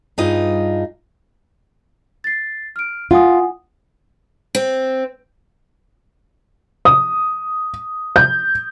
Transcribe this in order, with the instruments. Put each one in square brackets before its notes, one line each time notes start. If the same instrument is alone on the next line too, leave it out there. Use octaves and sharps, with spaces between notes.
[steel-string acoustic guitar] G2 D#4 F4 G#4 D#5
[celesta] A6 C7
F6 D7
[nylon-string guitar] F4 [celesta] F#5 G#5 D#6
[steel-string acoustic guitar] C4
[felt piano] D#6
G6